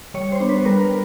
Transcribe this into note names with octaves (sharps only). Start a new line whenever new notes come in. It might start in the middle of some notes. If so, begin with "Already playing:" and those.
G3 C#5
C5
B3 D4
B4
G3 A#4